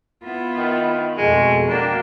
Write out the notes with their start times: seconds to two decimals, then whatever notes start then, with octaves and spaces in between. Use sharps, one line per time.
0.23 B3 E4 F4
0.57 D#3
1.18 F2 B2 G#3 A3
1.70 A#3 D4 F#4 G5